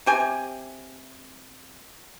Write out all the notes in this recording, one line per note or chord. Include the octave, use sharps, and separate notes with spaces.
C3 G4 G#5